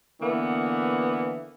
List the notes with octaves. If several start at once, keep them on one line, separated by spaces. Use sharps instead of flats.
D3 E3 A#3 B3